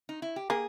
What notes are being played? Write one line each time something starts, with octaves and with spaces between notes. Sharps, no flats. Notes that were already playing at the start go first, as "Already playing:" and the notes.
D#4
E4
G4
A#3 G#4